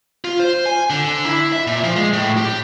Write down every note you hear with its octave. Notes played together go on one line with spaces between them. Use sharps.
F4
C5
G#5
D3
E4
E5
A#2
F3
G#3
A2
G4